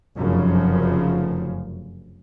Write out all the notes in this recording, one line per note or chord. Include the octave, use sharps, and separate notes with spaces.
F1 F#2 C#3 F3